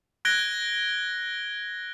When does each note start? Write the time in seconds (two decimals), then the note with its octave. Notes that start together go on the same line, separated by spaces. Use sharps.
0.25 F#6 G#6 A#6 D7 G7